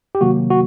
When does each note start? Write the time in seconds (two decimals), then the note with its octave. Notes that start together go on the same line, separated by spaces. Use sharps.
0.15 G4
0.21 C3 D#3 F#3 A#3 F#4
0.51 F#4